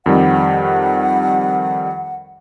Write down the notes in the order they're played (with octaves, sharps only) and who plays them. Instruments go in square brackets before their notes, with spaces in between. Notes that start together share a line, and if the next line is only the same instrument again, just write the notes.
[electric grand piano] F2 D#3 G3 [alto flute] F#5